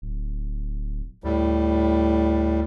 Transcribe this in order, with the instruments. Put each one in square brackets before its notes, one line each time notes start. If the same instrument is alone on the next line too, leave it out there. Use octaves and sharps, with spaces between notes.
[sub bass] D1
[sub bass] D2 [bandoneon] A2 G3